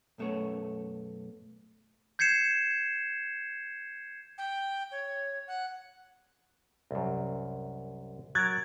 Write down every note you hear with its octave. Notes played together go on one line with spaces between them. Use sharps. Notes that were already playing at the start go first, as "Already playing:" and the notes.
B1 F#2 A3 B3 C#5
G6 G#6 C7 C#7 E7
G5
C#5
F#5
C2 F#2
F#3 A#4 F#6 G#6 A6